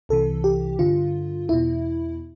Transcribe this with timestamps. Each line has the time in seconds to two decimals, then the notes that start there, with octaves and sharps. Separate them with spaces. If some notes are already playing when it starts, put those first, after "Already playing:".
0.09 C2 C3 E3 A4
0.44 G4
0.79 G2 D3 F4
1.49 E2 B2 E4